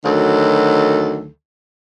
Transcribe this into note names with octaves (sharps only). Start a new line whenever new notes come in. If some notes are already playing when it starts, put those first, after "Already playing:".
D2 D#3 F#3 A4